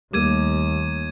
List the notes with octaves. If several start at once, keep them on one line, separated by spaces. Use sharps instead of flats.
D#2 G3 A3 A#3 D6 G#6 D#7